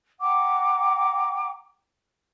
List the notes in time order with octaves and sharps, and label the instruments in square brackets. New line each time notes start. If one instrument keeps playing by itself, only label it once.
[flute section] F#5 G5 A#5 D6